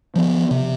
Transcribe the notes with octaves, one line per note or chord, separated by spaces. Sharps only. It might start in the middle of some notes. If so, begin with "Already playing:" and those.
F3 B3
C3